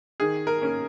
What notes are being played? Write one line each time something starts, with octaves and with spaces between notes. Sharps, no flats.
D#3 G#4
A#4
A#3 C#4